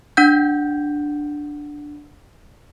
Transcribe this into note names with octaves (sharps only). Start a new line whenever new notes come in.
D4 F#5 G6